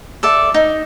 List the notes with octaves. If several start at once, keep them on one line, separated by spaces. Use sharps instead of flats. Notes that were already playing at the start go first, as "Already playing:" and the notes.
A4 D5 E5
D#4